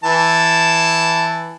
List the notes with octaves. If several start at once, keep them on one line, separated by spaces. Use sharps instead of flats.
E3 A5